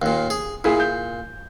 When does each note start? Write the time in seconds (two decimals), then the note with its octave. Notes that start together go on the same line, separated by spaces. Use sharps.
0.02 D#2 A#2
0.30 G#4
0.64 A#2 E4 G#4
0.80 G6